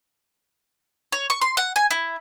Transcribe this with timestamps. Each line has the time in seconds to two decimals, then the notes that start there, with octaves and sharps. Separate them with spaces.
1.12 C#5
1.30 C#6
1.42 C6
1.57 F#5
1.76 G#5
1.91 E4